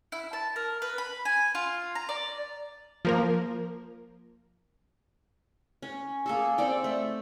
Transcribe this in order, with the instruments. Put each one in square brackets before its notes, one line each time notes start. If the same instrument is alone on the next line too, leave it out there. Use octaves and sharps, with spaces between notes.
[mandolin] E4
A5
A#4
B4
B5
G#5
F4
A#5
D5
[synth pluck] F3 A#3 A#4
[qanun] C#4
A#3 G#4 A4
C4 A4 D5 G5
A3